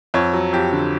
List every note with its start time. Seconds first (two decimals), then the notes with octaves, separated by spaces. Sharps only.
0.14 F2 C#5
0.33 F#3
0.53 F2 G4
0.73 D3